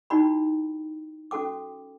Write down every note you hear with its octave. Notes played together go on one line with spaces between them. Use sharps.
D#4 E4 F#4 D5 G5 B5
C#4 F#4 A4 G5 D6